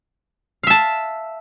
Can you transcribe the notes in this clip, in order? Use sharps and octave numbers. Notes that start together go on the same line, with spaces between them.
E5 F5 A5